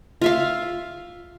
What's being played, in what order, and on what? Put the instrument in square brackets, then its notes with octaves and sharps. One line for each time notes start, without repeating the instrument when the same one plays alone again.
[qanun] F4 E5 F5